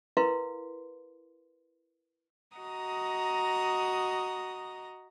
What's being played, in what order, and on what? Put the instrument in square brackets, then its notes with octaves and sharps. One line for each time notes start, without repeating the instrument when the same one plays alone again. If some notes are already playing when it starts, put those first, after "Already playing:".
[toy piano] E4 A#4 B4 F5 C6
[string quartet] F#4 D#5 A#5 D#6